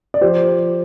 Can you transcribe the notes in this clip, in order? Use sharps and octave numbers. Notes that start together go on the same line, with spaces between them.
D5
F3 G4 C5